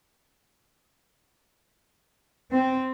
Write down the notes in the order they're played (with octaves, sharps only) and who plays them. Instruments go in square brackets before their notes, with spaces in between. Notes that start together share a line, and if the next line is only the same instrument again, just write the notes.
[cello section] C4